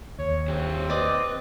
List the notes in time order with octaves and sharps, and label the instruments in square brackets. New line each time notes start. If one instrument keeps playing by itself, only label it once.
[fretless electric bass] D#2 [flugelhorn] C#5
[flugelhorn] C4 [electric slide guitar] G4 C5 C#5
[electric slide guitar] B4 [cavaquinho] D5 D#5